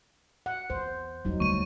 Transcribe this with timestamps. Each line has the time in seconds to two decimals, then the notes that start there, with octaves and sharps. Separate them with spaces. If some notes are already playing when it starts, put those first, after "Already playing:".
0.46 F#5
0.70 E2 C5
1.25 F1 E2 F#3 D#4
1.40 D2 G3 A3 C#6 D#7